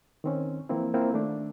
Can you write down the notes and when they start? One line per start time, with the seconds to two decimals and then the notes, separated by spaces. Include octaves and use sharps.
0.24 D#3 C4 C#4
0.69 E3 F3 A#3 C4 E4
0.94 A#3 C4 E4 F4
1.13 D#3 A3 D4